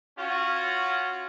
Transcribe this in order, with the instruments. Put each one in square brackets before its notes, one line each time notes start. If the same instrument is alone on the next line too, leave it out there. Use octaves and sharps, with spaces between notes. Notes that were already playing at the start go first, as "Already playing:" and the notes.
[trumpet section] C#4 F4 F#4